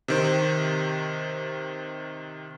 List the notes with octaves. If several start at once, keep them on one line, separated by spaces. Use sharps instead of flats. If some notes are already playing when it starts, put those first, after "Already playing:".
C3 D#3 C5